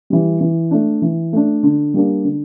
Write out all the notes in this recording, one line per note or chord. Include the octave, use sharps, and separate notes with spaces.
E3 G3
E3
A3 D4
E3
A3 D4
D3
G3 A#3 D4
D3